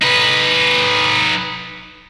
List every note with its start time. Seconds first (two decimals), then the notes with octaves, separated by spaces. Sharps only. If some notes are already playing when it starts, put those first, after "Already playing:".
0.02 D#4 B4